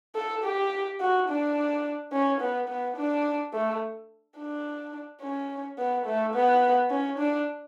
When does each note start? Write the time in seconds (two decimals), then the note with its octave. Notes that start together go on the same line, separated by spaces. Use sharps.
0.15 A4
0.44 G4
1.00 F#4
1.28 D4
2.12 C#4
2.40 B3
2.68 B3
2.96 D4
3.53 A3
4.37 D4
5.22 C#4
5.78 B3
6.06 A3
6.34 B3
6.90 C#4
7.18 D4